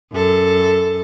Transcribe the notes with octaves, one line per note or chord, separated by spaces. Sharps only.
F#2 A4